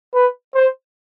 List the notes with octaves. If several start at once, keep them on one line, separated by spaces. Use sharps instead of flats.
B4
C5